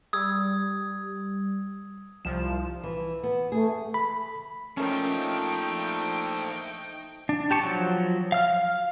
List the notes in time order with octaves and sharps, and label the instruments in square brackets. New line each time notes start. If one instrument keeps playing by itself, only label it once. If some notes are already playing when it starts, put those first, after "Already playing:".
[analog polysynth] G3 [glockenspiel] D#6 E6 G#6
[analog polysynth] C2 F3 [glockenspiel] E7
[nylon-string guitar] E3
B3
[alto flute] A3 [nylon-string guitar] G#4
[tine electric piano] B5
[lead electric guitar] A#2 F3 [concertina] A3 [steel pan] C#4 A#4 [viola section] D#4 G5
[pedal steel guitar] D4
G4 A5 C#6
F3 F#3
F5 F6